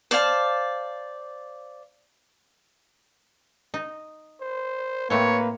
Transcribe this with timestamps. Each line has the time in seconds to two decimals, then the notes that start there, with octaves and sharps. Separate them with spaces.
0.11 C5 D5 F5 A5
3.74 D#4
4.41 C5
5.10 A2 A3 A#3 C4 B4 C#5